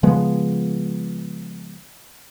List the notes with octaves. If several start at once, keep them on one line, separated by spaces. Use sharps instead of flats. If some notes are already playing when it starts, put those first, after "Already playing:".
C#3 F3 G#3 B3